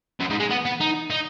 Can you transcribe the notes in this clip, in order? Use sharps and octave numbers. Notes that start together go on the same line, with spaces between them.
F#2
G#2
G#3
B3
B3
D#4
D#4